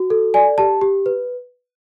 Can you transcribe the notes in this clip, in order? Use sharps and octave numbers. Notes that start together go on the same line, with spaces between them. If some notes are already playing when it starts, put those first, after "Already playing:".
Already playing: F#4
A4
D5 G#5
G4 A5
G4
B4